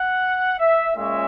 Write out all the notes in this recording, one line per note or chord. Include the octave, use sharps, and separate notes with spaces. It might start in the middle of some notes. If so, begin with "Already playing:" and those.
Already playing: F#5
E5
A#2 G#3 C#4 E5